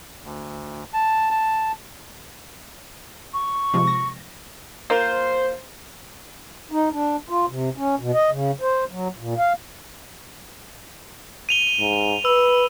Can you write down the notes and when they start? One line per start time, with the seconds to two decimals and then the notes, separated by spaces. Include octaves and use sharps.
0.23 D2
0.93 A5
1.31 A5
3.34 C#6
3.74 C3 F3 G#3
3.87 A#6
4.90 A#3 F4 C5
6.71 D#4
6.93 D4
7.29 F4
7.50 C3
7.77 C#4
7.99 B2
8.14 D#5
8.31 C#3
8.61 C5
8.91 F#3
9.18 A#2
9.38 F5
11.49 D#7 F7 G7
11.80 G#2
12.25 B4 E6